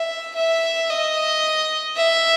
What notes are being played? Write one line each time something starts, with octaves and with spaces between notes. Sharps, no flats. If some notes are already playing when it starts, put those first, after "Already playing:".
Already playing: E5
E5
D#5
E5